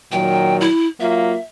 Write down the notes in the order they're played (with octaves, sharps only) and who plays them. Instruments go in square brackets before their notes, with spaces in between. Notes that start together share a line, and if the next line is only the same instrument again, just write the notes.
[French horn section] A#2 D#3 F#3 [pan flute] G5
[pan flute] E4
[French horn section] F#3 A#3 F4 [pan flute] E5